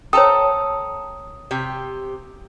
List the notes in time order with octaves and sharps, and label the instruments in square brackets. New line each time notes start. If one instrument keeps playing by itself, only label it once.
[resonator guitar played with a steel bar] A4 A5 A#5 [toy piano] C#5 G5 [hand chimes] D#6
[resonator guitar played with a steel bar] C3 G4